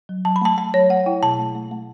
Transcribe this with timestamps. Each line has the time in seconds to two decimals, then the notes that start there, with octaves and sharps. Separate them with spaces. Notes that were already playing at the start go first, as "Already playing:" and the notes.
0.09 F#3
0.25 F#3 A5
0.36 B5
0.41 A3 A5
0.57 A3 A5
0.74 F#3 C#5
0.90 A3 F#5
1.06 E4 G5
1.22 B2 A5
1.39 A3
1.55 A3
1.71 A3